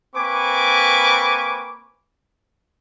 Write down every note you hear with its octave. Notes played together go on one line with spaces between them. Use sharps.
A#3 C4 B4 G#5 C#6 D6